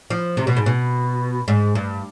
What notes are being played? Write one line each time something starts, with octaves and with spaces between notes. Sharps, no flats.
F3
C3
B2
G#2
B2
G#2
G2